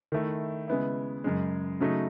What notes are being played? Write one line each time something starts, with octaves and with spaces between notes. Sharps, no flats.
D#3 A3 E4
C#3 G#3 B3 E4
F#2 C#3 G#3
C#3 F#3 A3 D#4